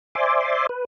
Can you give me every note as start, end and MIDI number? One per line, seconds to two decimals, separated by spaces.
0.15 0.67 72
0.15 0.67 74
0.15 0.67 76
0.15 0.67 80
0.15 0.67 84
0.15 0.67 86
0.69 0.85 71